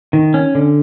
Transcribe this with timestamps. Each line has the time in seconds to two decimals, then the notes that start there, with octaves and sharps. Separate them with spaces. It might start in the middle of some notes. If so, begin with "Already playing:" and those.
0.13 D#3
0.34 C#4
0.55 D3